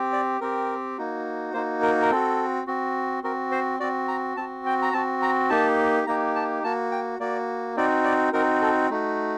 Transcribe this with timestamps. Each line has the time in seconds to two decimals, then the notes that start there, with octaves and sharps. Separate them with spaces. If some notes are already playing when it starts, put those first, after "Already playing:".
Already playing: C4 G4
0.13 D5
0.41 C4 G4 A#4
0.98 A#3 D#4 F#4
1.53 A#3 D#4 F#4 C5
1.82 A#4
2.02 A#4
2.11 C4 F#4 A4
2.67 C4 F#4
3.24 C4 F#4 A#4
3.51 C5
3.80 C4 F#4 D5
4.08 A#5
4.37 C4 F#4 A5
4.66 G5
4.82 A#5
4.93 C4 F#4 A5
5.22 A#5
5.50 A#3 D#4 G4 A5
6.07 A#3 D#4 G4 A#5
6.36 A5
6.64 A#3 F#4 A5
6.92 G5
7.19 A#3 F#4 D5
7.76 C4 D#4 F#4 D5
8.05 D5
8.33 C4 D#4 F#4 A#4
8.62 A4
8.90 A3 D#4 F#4